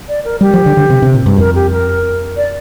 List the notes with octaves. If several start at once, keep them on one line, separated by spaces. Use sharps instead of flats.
D5
A#4
G3 G4
F3
D3
D3
C3
C3
A#2
G2
G4
F2 A#4
G4
A#4
D5